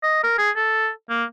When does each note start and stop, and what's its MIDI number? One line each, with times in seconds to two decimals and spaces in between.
0.03 0.20 75
0.23 0.36 70
0.38 0.50 68
0.56 0.89 69
1.09 1.24 58